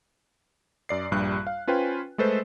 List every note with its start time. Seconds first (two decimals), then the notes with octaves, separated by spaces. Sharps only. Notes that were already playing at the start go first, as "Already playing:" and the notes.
0.89 F#2 D5 C7
1.11 A#1 G2 G3 F#6
1.47 F5
1.67 C#4 F4 B4 C5 G5 G#5
2.18 G#3 A3 A4 B4 C5